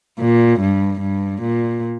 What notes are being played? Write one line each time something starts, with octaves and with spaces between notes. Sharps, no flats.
A#2
G2
G2
A#2